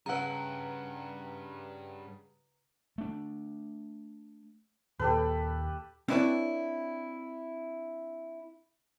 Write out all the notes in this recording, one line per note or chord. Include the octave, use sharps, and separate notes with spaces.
G2 C#3 B4 F#5 A#5
A3 D4
D#2 A#2 A#3 G4 A4 B4
C4 D4 E4 B4 C#5 D5